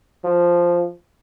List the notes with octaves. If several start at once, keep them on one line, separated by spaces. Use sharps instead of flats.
F3